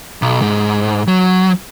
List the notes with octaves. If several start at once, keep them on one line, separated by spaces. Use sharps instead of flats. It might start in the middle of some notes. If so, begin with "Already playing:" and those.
B1
G#2
F#3